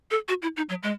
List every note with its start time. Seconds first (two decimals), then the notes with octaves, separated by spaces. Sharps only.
0.11 A4
0.29 F#4
0.42 E4
0.57 D#4
0.69 F#3
0.83 G#3